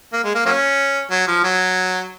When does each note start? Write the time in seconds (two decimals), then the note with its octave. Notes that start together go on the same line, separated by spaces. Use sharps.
0.13 A#3
0.24 G#3
0.34 A#3
0.46 F#3 A#3 C#4
1.10 F#3
1.27 F3
1.44 F#3